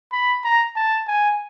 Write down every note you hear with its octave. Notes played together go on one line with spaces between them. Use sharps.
B5
A#5
A5
G#5